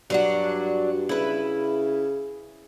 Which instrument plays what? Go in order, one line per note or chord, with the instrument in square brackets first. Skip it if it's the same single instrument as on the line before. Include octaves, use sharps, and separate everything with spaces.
[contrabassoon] G2 [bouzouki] F#3 D4 F#4
[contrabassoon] C#3 [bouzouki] E4 B4